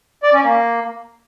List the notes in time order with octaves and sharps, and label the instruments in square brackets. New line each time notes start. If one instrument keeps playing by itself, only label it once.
[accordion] D5
C#4
A#3